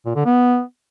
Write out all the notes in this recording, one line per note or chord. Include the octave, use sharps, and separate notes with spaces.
A#2
D3
B3